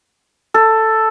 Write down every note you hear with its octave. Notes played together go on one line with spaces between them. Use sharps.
A4